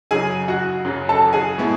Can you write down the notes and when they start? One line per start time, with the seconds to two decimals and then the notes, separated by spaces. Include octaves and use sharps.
0.11 F#2 C#3 F#3 G#4 G#5
0.48 F#4 F#5
0.85 F#2 C#3 F#3
1.09 A4 A5
1.33 G#4 G#5
1.58 A2 G#3 B3 E4